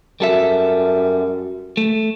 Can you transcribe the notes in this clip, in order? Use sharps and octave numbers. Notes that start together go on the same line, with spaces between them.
F#2 G3 A4 E5
A3